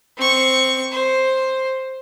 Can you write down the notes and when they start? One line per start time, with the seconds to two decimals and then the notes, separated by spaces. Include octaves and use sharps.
0.17 C4 C#6
0.92 C5